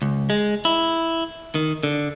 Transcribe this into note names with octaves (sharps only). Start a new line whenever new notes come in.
C#2
G#3
E4
D#3
D3